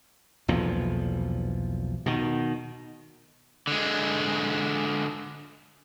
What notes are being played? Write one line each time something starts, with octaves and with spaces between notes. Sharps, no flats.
B1 E2 A#2 F3
B2 D#3
D3 G#3